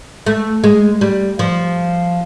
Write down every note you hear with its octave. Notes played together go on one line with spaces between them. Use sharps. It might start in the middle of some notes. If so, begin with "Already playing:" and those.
A3
G#3
G3
F3